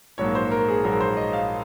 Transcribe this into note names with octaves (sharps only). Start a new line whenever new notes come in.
A#1 G#2 F#3 A#3 C#5
C5
A#4
G#4
A#1 G#2 F#3 A#3 A#4
C5
D#5
F5